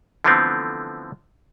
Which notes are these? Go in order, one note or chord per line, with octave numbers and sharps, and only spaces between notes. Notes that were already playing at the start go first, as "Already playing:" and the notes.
D3 E3 F3 A3 B3 C4